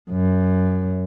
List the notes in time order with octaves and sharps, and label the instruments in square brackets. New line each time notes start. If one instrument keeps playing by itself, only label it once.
[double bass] F#2